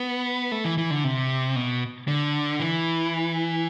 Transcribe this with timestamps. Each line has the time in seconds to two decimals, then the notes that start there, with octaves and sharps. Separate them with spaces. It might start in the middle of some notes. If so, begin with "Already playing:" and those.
Already playing: B3
0.52 A3
0.64 E3
0.78 E3
0.91 D3
1.04 C3
1.56 B2
2.08 D3
2.60 E3